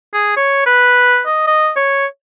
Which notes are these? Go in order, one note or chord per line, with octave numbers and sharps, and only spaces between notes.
G#4
C#5
B4
D#5
D#5
C#5